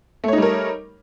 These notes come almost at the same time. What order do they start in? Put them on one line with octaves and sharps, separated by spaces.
A3 C#5 D#4 G3 A#4